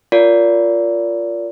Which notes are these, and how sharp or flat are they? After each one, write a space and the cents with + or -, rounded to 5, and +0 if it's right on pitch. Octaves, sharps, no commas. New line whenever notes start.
F4 +0 A#4 +0 D5 -30